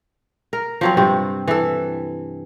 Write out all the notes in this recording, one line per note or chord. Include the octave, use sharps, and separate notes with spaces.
A#4
F3 F#3 C4
G2 C3 C4
E3 A4